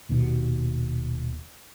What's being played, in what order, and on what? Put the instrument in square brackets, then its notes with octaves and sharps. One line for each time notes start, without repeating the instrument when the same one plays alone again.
[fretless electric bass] D#1 D#2 B2